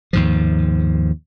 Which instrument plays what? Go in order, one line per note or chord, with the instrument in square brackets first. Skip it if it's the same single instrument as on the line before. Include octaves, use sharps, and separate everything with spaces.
[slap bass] D#2 G#2 F3